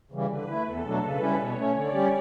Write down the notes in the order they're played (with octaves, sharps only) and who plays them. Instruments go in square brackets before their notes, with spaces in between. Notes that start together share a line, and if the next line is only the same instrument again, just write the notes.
[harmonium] C#3 E3 G3
[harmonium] D3 [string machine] B4
[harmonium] A3 E4
[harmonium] E2 [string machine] A4
[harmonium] B2 F#3 A3 D4
[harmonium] C#3 [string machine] B4
[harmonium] G3 C#4 E4
[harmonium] B2 [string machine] C#5
[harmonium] A3 C#4
[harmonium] D3 [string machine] D5
[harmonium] G3 C#4 G4